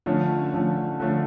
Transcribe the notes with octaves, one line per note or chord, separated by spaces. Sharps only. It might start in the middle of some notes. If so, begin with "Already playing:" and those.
D3 F3 A3 C#4
D3 F3 A3 C#4
D3 F3 A3 C#4